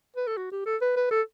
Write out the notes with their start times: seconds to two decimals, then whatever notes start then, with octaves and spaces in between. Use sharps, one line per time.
0.17 B4
0.27 A4
0.37 F#4
0.52 G4
0.66 A4
0.81 B4
0.96 B4
1.11 A4